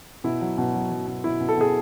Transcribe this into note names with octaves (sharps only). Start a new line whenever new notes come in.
B2 E4
F#3
B2
F#3
F#3
B2
B2 E4
B2
A4
B2 G#4